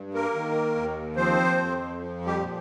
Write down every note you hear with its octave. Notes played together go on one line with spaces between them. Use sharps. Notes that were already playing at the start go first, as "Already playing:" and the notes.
Already playing: G2
A#3 A#4
D#3
D#2
F3 C4 C5
F2
F3
G3 G4
A#2